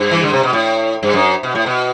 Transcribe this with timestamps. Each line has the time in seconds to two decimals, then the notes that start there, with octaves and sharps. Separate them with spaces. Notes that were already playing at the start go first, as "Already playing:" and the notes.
Already playing: G2
0.11 E3
0.23 D3
0.33 C3
0.43 B2
0.53 A2
1.03 G2
1.13 F#2
1.43 B2
1.55 A2
1.66 B2